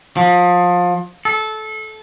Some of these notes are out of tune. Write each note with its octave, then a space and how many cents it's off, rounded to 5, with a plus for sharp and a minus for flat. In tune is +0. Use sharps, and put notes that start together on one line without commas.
F3 +25
A4 -20